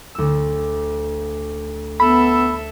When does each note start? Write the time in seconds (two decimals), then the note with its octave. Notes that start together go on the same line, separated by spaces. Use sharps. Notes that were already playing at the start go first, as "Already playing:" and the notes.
0.15 D2 E6
2.00 B3 A4 E5 B5